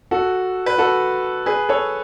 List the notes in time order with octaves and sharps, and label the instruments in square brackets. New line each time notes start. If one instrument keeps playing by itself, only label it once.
[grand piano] F#4 A4
B4
F#4 A4
G#4 B4
A4 C#5